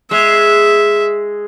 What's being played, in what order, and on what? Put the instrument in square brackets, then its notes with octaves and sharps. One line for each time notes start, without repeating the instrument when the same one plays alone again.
[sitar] G#3 [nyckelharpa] E5